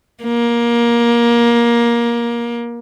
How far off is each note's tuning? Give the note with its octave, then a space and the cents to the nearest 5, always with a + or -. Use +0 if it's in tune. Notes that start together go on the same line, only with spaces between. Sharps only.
A#3 +20